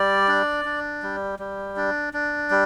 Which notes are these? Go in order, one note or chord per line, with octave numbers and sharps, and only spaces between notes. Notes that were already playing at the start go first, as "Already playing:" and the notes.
Already playing: G3 D5
D4
D4
G3
G3
D4
D4
G3